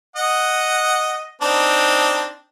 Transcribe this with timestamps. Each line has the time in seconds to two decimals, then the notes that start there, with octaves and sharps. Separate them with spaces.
0.16 D#5 F#5
1.41 C4 D4 D#4